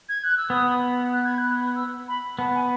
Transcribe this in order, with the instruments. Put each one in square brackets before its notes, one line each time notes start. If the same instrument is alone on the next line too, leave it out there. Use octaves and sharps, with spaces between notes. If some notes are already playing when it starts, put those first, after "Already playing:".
[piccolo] G#6
F#6
E6
[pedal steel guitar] B3 [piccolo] D#6
[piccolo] F#6
G#6
F#6
E6
B5
[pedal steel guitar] B3 [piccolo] A5
[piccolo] G#5